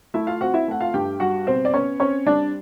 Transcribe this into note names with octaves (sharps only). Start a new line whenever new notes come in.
A3 E4 E5
F4 F5
C4 F#4 F#5
E4 E5
A3 F#5
F4 F5
G2 G4 G5
G3 F#4 F#5
B2 C4 C5
D5
B3 C#4 C#5
C4 C#4 C#5
G3 D4 D5